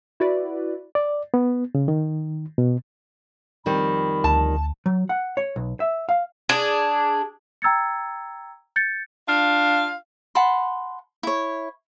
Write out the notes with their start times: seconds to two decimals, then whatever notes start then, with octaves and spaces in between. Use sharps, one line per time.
0.20 E4 F#4 B4 D5
0.95 D5
1.34 B3
1.75 C#3
1.88 D#3
2.58 B2
3.66 F2 D#3 G3 B5
4.24 D2 A5
4.86 F#3
5.09 F#5
5.37 C#5
5.56 B1
5.80 E5
6.09 F5
6.49 D4 G#4
7.62 G5 A#5 E6 G#6 A6 C#7
8.76 G6 A6 C#7
9.27 D4 F4 F5
10.35 F#5 A5 B5 C6
11.23 E4 C#5